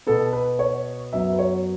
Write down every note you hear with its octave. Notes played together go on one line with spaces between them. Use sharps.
B2 B3 A4
B4
C#5
F#2 F#3 B3 E5
B4
C#5